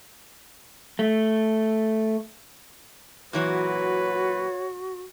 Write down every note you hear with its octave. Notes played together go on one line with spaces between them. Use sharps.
A3
A#2 E3 F#3 F#4 B4 C#5